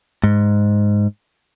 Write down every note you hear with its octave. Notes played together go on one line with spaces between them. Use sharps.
G#2